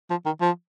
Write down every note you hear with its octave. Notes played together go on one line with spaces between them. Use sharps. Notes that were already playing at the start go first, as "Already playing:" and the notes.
F3
D#3
F3